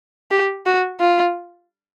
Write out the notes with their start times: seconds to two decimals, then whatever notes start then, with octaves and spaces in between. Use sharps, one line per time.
0.31 G4
0.66 F#4
1.00 F4